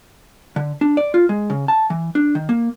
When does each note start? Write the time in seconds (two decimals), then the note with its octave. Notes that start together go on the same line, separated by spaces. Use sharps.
0.56 D3
0.81 D4
0.97 D5
1.14 F4
1.29 G#3
1.50 C#3
1.68 A5
1.90 E3
2.15 D4
2.35 D#3
2.49 A#3